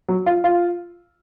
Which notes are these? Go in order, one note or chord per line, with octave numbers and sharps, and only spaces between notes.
F#3
F4
F4